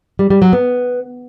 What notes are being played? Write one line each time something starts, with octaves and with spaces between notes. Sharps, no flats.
G3
G3
F#3
B3